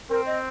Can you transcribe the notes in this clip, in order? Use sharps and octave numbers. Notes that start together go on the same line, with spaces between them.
C4 A#4
D#5